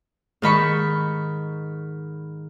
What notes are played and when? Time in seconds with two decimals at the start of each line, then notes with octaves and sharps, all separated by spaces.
0.42 G#2 D#3 B5 C#6